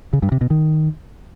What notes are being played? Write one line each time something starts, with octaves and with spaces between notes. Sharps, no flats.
C#3
G2
C3
B2
D#3